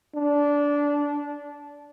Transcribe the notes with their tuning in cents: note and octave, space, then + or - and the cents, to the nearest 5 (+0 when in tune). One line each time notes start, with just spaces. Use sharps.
D4 -15